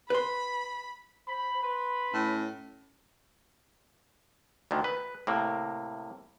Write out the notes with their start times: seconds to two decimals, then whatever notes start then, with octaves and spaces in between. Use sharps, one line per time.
0.10 B4 B5 C6
1.28 C5 B5
1.63 B4 B5 C6
2.14 A2 C#4
4.71 D2 D3 D#3
4.84 B4
5.27 A2 C3 A#3